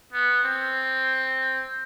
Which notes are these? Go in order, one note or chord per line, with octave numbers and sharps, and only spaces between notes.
B3
C4